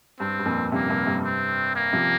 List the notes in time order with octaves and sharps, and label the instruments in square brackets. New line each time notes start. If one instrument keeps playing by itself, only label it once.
[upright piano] G2 [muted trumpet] C4
[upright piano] G2
F2 A#2
[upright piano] G2 C3 [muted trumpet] A#3
[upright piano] G2 C3
G2 C3
[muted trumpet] C4
A#3
[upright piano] C3 F3